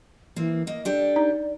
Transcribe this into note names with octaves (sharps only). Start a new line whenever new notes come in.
E3 A#3 C4
A#3 D#5
D4 G4 A4 D5
D#4